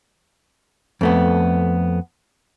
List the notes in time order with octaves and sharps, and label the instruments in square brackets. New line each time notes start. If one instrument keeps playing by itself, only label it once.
[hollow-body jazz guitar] F2 A3 B3